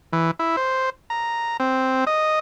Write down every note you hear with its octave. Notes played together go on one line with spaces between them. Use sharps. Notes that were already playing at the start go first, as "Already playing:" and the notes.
E3
E4
C5
A#5
C4
D#5